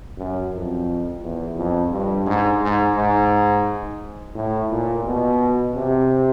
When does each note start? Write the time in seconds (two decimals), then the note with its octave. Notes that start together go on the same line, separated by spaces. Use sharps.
0.17 F#2
0.52 F2
1.22 E2
1.56 F2
1.91 G2
2.26 G#2
2.61 G#2
2.96 G#2
4.35 A2
4.70 A#2
5.04 B2
5.74 C3